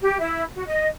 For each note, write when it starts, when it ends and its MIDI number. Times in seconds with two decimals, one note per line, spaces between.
0.01 0.17 67
0.19 0.41 64
0.55 0.63 66
0.67 0.87 75